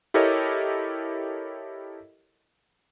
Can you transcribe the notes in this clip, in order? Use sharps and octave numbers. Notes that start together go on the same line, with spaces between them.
E4 G4 A4 A#4 C#5 D#5